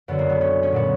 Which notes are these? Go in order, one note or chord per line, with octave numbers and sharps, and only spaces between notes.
F#2 D3 F#3 B3
A#3
B3
C#4
C#4
A#2 F#3 B3